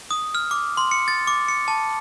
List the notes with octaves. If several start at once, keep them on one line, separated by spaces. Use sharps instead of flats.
D#6
F6
D6
C6
C#7
A6
D6
C#7
A5